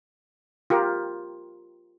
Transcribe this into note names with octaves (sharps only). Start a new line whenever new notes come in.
F4 G4 A#4